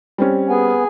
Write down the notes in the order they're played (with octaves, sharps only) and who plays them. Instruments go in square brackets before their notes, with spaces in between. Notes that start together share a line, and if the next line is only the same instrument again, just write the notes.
[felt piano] G3 C4 C#4
[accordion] B3 [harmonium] G#4 G#5